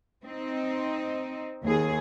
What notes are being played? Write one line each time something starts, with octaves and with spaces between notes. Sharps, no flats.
C4 D#4
D#2 G#4